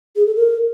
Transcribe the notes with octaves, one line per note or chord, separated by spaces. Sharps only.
G#4
A4
A#4